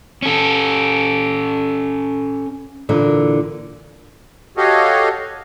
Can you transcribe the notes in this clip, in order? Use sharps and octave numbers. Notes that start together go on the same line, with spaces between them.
C#4 A4
A#2 D3 E3 A#3
F#4 G4 A4 C#5 D#5 F5